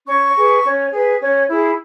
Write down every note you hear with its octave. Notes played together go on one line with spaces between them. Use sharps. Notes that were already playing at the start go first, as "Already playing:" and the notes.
C#4 C#6
G#4 B4
C#4
G#4 B4
C#4
E4 G#4